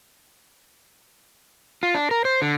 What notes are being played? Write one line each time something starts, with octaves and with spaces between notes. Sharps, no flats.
F4
D4
A#4
C5
D3